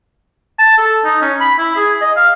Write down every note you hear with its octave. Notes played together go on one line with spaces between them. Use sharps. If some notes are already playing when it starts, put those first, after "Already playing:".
A5
A4
D#4
C#4
B5
E4
G#4
D#5
F5